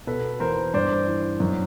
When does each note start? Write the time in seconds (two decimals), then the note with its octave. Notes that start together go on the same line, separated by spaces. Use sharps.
0.07 B2 A4 B4
0.40 E2 A#4 C5
0.74 G2 C5 D5
1.07 E3
1.40 F#2